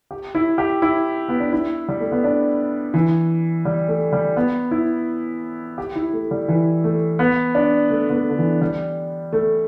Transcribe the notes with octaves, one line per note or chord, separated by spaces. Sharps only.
G4
E4
G4
E4
B3
D4
E4
G3
A3
B3
D4
E3
G3
A3
G3
B3
E4
G4
E4
A3
G3
E3
A3
B3
D4
A3
B3
A3
D3
E3
G3
A3